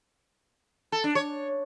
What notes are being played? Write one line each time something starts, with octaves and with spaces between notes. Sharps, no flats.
A4
D4
C#5